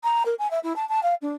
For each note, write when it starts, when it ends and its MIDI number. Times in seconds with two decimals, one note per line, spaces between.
0.03 0.23 82
0.25 0.35 70
0.39 0.50 80
0.51 0.59 76
0.63 0.76 64
0.76 0.88 81
0.89 1.02 81
1.03 1.14 77
1.22 1.35 62